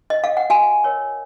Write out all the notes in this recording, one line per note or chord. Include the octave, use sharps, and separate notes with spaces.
D#5
F5
F#5
F#4 F5 G#5
A#4 C#5